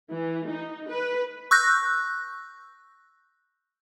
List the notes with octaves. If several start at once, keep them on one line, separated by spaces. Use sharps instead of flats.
E3
D#4
B4
C#6 E6 F#6 G6 A#6